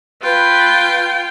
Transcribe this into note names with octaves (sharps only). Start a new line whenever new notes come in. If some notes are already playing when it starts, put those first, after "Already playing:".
F4 B4 G5